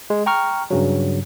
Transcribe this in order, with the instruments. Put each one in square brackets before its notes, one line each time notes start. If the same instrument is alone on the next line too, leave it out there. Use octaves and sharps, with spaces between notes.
[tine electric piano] G#3
G5 A#5 C#6 F6
G2 C#3 F#3